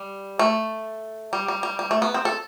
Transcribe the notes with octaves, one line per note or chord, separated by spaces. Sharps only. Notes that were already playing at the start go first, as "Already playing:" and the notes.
Already playing: G3
A3
G3
G3
G3
G3
A3
B3
C4
A4